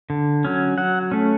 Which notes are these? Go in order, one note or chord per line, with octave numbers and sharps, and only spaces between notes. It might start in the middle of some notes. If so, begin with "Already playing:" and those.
D3
F#3 C#4
F#3 F#5
A3 C#4